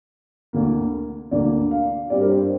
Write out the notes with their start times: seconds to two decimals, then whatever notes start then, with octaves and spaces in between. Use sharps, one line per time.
0.53 D2 D3 A#3
1.31 D2 D3 A#3 D5
1.71 F5
2.10 G2 G3 C4 D5
2.21 A#4
2.30 C5